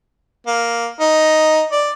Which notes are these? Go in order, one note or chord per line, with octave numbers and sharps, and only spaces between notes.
A#3
D#4
D5